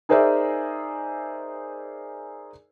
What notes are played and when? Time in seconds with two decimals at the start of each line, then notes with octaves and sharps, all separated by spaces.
0.09 D#4 G#4 A#4 C5 D5 E5